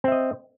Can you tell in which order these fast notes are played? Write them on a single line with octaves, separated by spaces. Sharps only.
C4 E5 D#5